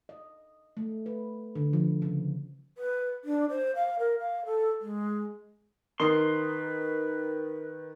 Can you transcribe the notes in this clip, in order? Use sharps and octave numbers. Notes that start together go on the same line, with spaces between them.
D#5
A3
B4
D3
F3
C#3
B4
D4
C5
F5
A#4
F5
A4
G#3
D#3 A#4 B4 D#5 C6 C7